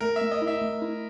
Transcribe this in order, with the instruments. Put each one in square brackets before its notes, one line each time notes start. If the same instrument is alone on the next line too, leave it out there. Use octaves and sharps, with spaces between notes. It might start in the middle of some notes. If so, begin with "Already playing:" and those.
[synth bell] A3 [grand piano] A#4
[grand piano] E5
[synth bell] A3
[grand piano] D#5
[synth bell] E4
[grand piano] E5
[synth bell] A3
E4